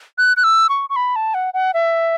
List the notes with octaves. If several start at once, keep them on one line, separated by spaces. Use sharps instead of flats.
F#6
F#6
E6
C#6
C#6
B5
A5
F#5
F#5
E5